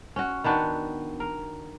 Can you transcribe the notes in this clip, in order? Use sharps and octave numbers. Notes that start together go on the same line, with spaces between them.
C#4 F#4
D#3 B3 D4 F#4
A#4